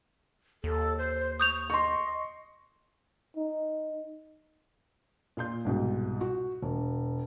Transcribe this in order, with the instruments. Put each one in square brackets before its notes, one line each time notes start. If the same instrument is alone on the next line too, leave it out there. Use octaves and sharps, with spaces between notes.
[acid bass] D#2 [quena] A4
[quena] C5
[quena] C#6 [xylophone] D#6 G6 F7
[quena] D#5 [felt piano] C6 C#6
[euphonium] D#4
[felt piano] A#2 F4 C6 G6
C2 G#2 B2
F#4
E1